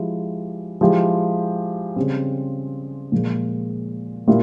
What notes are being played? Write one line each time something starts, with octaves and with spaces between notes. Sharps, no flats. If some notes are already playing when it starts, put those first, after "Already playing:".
Already playing: F3 G#3 E4 G4
F3 G#3 E4 G4
C#3 G3 C4
A#2 F3 G#3
A#2 G3 E4 G4